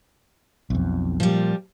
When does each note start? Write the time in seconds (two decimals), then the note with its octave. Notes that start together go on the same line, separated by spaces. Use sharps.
0.70 B1 F2
1.20 A#2 F3 G3